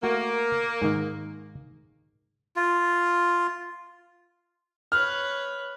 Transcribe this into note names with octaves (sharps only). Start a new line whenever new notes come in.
A3 A#3 F#4
G#2 D#3
F4
B4 C#5 F6